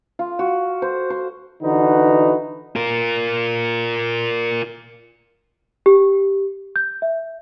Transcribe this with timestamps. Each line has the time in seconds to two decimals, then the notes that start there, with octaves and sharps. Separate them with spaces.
0.19 F4
0.39 F#4
0.82 C5
1.10 C5
1.63 D3 E3 D#4 F#4 B4
2.76 F4 A#4
5.86 G4
6.76 G6
7.02 E5